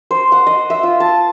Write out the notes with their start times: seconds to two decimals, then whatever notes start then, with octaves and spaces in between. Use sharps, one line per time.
0.11 C5
0.32 F#5
0.47 D#5
0.70 E5
0.83 F4
1.00 A5